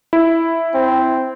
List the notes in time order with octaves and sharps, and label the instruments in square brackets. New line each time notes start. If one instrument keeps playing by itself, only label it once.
[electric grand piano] E4
[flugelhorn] C4